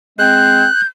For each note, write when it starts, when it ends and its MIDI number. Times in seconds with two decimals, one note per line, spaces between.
0.19 0.65 56
0.19 0.65 60
0.19 0.81 90
0.19 0.87 91